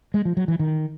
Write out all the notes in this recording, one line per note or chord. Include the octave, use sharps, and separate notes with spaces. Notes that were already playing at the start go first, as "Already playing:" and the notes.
G#3
F3
F#3
E3
D#3